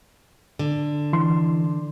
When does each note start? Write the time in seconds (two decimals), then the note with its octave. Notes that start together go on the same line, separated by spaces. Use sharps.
0.59 D3
1.13 E3 C6